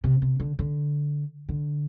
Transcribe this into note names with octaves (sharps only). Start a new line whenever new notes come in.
C3
C3
D3
D3
D3